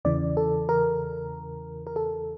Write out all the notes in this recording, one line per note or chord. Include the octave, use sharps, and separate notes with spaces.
E2 C#3 E3 D5
A4
A#4
A#4
A4